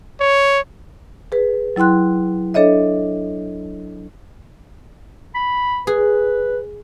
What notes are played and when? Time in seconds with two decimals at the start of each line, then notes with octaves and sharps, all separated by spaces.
0.20 C#5
1.32 G#4 B4
1.76 F#3 E4 G5 C6 F#6
2.54 D4 A4 C#5 D#5 E5
5.35 B5
5.87 G#4 B4